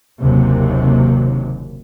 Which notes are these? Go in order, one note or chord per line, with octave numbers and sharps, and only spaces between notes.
F#1 D#2 C3 F#3